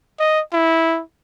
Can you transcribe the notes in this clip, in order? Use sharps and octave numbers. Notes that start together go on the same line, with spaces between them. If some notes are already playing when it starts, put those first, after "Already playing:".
D#5
E4